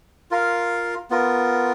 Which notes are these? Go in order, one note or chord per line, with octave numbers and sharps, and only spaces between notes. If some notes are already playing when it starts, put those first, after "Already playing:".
F4 A#4 F5
B3 F4 A#4